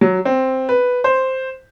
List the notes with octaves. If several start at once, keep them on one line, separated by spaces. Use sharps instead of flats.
F#3
C4
B4
C5